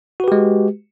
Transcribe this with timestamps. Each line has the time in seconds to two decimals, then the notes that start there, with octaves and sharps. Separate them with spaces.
0.20 F#4
0.24 B4
0.28 G4
0.32 G#3